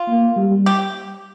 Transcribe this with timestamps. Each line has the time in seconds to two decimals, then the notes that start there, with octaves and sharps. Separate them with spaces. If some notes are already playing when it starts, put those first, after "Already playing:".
Already playing: F4
0.08 A#3
0.37 G3
0.66 G4